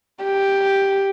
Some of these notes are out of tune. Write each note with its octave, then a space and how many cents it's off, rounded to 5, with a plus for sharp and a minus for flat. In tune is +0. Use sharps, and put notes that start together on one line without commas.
G4 +0